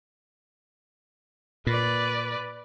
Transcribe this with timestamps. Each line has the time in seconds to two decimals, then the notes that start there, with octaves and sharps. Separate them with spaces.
1.67 A#2 B4 D5